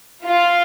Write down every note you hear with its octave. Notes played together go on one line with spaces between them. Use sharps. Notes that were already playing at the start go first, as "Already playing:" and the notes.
F4